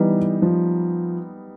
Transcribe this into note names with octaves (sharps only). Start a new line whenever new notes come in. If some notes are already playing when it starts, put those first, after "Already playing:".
Already playing: E3 G3 B3 D#4
F3